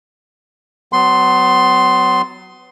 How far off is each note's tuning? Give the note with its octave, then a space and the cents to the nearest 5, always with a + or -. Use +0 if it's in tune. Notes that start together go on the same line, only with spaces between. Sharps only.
F#3 +0 B3 +30 C6 +0